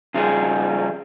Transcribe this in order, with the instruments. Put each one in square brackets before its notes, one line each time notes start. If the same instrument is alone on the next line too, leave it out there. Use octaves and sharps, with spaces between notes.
[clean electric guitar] C#3 F3 G3 G#4